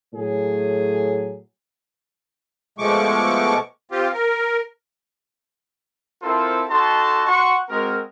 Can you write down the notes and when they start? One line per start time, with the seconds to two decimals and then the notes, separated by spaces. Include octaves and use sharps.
0.14 A2 F#3 A3 G#4
2.78 B2 F3 G#3 A3 C#6 D6
3.91 C4 F4 G4
4.13 A#4
6.22 C4 E4 F4 A4 A#4 C5
6.69 D#4 F#4 A4 A5 C6
7.27 F#4 F#5 C6 C#6
7.69 G#3 C4 F#4 A#4